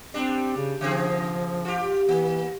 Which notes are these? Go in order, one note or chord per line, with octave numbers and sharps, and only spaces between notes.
G3 C4 D4
C#3
C#3 F3 C4 G#4
F4 G4
E3 A#3